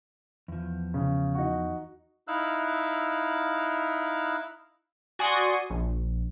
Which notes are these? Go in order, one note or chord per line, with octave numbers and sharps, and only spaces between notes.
E2 F3
C#3
D#4 F#4
D#4 E4 F5 E6 F#6
F#4 D5 G#5 C6 C#6 D#6
A#1